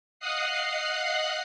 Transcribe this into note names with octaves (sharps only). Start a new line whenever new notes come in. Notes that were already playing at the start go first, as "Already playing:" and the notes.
D#5 F5 F#5 D#6 F#6 C7